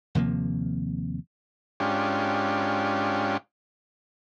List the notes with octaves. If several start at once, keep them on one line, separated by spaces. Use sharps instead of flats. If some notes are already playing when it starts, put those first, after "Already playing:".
D#2 C3 F3 A#3
G#2 C#4 D4 F4 G4